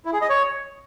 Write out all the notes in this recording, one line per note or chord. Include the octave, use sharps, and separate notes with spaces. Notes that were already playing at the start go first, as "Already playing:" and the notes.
E4
G#4
D#5
C#5